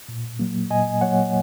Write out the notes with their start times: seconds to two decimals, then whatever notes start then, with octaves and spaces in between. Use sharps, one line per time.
0.09 A#2
0.39 F#3 A#3
0.71 A#2 D#5 G#5
1.01 F#3 A#3 C#5 F#5